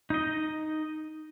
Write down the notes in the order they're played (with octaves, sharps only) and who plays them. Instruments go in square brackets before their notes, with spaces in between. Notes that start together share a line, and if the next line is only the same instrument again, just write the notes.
[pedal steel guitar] D#4 D#5